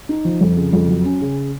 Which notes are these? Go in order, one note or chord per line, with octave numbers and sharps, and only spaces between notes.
D#4
F3
F2
C#3
F2
F#3
C#4
C#3